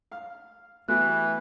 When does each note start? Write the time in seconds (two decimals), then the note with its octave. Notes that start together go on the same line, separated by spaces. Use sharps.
0.12 F5 F6
0.88 E3 G3 A3 B3 F#4 F#6